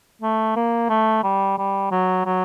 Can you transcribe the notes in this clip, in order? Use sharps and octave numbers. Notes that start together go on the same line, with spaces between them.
A3
A#3
A3
G3
G3
F#3
F#3